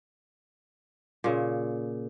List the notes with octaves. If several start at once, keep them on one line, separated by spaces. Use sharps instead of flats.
A#2 C#3